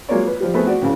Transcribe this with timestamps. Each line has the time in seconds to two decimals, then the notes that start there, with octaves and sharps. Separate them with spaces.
0.09 F#3 G#3 A#3 F4 C#5 D5
0.27 B4
0.41 F3 G3
0.54 A3 B3 C4 G#4
0.67 F#4 D5
0.82 C#2 A2 C#3